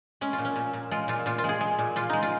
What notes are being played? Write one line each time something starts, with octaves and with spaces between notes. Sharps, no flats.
G#3 C#4
F4
A#2
C#4
A#2
A#2
G#3 F4
A#2 F4
A#2 F4
F4
G#3 G#4
G#3
A#2
A#2 F4
G#3 D#4
F4